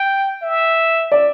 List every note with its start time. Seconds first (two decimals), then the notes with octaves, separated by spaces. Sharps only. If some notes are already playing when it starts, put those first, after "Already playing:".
Already playing: G5
0.42 E5
1.12 D5